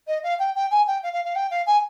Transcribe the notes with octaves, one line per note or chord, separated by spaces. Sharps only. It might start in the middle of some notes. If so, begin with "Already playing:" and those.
D#5
F5
G5
G5
G#5
G5
F5
F5
F5
G5
F5
G#5